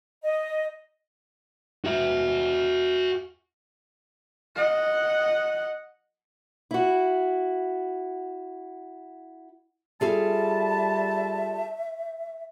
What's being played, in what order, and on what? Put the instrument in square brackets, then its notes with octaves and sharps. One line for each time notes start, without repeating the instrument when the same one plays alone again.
[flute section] D#5
[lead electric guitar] F#4 E5
[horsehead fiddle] D#5 F#5
[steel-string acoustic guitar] E4 F#4
[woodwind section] G3 A5 [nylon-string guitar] F4 G#4 A4 [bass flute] E5